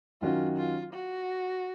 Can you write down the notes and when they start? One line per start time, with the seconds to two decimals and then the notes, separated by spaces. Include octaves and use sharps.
0.21 F#2 D#3 F#3 C#4 F4 F#4
0.58 F4
0.94 F#4